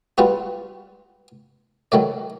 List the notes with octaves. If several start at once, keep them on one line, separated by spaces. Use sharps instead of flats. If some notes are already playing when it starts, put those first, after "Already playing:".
G3 B3 F4 F#4
D#3 F#3 A3 D5